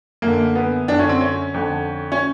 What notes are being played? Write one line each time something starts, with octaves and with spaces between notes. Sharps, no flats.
F#2 D3 A#3
B3
F#2 D3 D4
C#4
C4
C#4
F2 D3
C#4